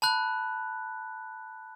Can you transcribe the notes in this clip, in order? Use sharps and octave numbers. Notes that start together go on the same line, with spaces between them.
A5 B5 F#6